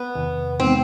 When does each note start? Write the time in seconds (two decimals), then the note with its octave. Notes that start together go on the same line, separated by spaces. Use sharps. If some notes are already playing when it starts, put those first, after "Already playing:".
Already playing: B3
0.15 E2 C3 D#3
0.60 C3 E3 G#3 B3 C4 D#4